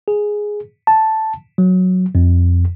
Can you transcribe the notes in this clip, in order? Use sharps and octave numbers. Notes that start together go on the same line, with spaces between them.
G#4
A5
F#3
F2